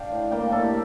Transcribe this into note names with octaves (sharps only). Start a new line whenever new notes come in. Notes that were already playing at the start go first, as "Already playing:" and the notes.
Already playing: D4 F5 G5
A2
G3 A#3 D4 G5
A2 A4
G4